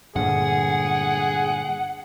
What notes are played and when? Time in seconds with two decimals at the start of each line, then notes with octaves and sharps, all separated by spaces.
0.16 G2 A#2 D3 G#4 F#5